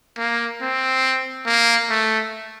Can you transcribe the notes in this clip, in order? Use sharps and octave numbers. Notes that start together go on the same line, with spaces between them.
A#3
C4
A#3
A3